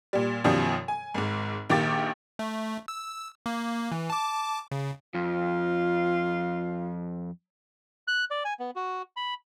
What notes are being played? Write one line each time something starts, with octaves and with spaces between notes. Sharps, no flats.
A#2 G3
F#2 B2 D#3 F3 G3
G#5
G#1 G#2
A#1 D#3 A#3 G4 D6 A6
A3
E6
A#3
E3
A5 D6
C#3
F2 F4
F#6
D5
G#5
B3
F#4
B5